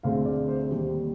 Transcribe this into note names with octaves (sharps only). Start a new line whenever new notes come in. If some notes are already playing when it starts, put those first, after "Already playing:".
D2 D3 G#3 C4 F5
D5
C5
D#2 D#3 G3